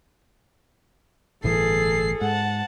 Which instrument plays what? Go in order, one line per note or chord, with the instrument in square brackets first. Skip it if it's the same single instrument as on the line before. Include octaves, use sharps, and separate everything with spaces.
[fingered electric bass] G1 A2 E3 [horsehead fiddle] G#4 A4 [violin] C7
[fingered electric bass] G#2 [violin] F#5 A5